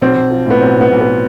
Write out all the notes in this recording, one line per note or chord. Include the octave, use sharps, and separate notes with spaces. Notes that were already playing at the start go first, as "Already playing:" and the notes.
B1 C4
B1
F3
A2 B3
B1 C4
A2 B3
B1
B3